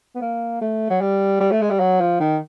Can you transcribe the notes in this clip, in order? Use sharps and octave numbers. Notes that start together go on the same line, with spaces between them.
B3
A#3
A3
F#3
G3
G3
A3
G#3
G3
F#3
F3
D#3